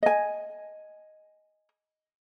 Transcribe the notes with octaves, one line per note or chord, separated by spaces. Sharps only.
D#5 G#5